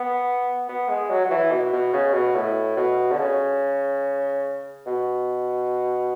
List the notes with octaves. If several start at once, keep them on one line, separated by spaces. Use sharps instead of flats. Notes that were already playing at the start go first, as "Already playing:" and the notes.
Already playing: B3
B3
G#3
F#3
F#3
E3
B2
B2
C#3
B2
A2
B2
D3
C#3
B2